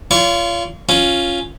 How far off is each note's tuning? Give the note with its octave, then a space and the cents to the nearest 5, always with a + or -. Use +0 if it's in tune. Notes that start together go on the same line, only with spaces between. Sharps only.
F4 -25 C#5 +45 C#6 +0
C#4 +0 F4 +0